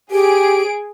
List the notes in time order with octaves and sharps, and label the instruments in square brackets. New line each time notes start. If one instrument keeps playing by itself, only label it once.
[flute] G4 [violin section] G#4 D7